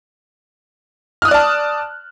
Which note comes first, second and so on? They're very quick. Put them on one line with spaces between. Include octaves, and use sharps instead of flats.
F6 D#6 F#6 D5 A5